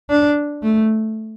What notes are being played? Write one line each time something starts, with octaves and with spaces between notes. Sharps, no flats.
D4
A3